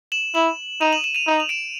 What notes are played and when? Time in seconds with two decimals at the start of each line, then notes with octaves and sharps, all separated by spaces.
0.12 E7 F#7
0.34 E4 E7 F#7
0.81 D#4 D#7 F7
0.92 E7 F#7
1.04 E7 F#7
1.15 D#7 F7
1.27 D#4
1.40 F7
1.49 D7 E7